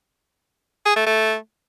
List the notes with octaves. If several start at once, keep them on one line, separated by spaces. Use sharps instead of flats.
G#4
A3
A3